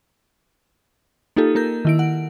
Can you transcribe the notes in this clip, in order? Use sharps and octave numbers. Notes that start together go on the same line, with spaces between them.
A#3 D#4 F4 G4 A4
A#3 A#4 G6
D#3 E4 D7
F#5